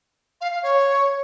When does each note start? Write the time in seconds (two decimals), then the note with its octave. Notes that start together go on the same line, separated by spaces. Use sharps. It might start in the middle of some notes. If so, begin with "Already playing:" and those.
0.41 F5
0.52 F5
0.63 C#5